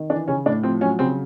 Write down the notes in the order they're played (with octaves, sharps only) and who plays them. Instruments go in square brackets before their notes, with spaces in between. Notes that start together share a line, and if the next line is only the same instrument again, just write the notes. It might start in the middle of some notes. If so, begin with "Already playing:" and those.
Already playing: [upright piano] D#3
E3 D4
C#3 C#4
A2 D4
F3 C4
F#3 C#4
C#3 C4